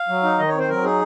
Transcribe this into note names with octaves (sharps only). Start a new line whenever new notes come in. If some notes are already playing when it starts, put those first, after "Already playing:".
Already playing: F5
F#3
D#4
D#3 D#5
C#5
C4
C5
F#3 A#4
D#4 G#4